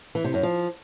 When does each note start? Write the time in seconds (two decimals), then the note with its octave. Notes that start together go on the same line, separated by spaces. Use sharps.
0.15 E3
0.24 C3
0.34 F#2
0.43 F3